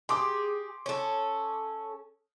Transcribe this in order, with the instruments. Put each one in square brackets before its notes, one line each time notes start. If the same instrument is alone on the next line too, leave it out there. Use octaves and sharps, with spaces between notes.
[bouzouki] G4 G#4 [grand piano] C6 D6
[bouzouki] C#4 A4